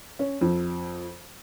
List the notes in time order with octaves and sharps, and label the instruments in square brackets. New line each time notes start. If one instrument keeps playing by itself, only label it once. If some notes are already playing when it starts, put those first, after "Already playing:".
[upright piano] C#4
F2